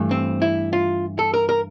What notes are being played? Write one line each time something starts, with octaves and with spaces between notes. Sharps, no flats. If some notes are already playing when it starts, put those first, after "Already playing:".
Already playing: G2 E3 A3
C4
E4
F4
A4
A#4
A#4